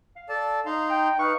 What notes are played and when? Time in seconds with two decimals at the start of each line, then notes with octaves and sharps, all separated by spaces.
0.16 F5
0.29 A4 D5 A5
0.66 D#4 F5 A#5 C6
0.90 G5
1.19 D#4 B4 F5 C#6